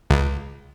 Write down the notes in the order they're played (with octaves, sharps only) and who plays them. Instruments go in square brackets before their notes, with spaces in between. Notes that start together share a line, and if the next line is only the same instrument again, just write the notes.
[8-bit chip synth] C#2